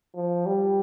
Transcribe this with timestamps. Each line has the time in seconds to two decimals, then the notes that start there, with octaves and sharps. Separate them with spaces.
0.15 F3
0.46 G3